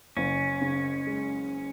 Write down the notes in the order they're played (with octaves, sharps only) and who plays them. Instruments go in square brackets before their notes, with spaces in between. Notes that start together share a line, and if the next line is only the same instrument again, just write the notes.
[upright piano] F#1 [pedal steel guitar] C#4
[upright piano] C#3
G#3